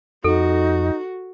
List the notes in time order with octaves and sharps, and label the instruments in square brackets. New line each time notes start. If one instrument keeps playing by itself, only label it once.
[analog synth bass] F2 [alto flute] D#4 [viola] F#4 [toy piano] A4